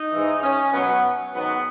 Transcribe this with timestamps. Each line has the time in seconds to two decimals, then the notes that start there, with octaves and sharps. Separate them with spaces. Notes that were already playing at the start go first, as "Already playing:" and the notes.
Already playing: D#4
0.12 G#2 E3
0.43 C#4
0.73 B2 F#3 B3
1.34 G#2 D#3 F#3 B3